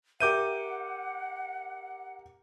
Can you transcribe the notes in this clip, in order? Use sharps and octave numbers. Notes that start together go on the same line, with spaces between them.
G4 A#4 E5 F#5 D6 G6 D#7